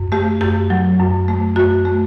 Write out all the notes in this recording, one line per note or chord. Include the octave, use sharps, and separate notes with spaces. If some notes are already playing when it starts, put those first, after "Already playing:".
Already playing: F#2
A3 G4
F#2 G4
F#3
F#2
A3
F#2 F#4
A3